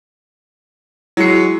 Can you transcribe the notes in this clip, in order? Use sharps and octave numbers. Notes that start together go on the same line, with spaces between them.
F#3 G#3 E4 C7 C#7